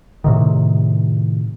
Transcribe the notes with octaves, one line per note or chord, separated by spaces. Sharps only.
A2 C3 D#3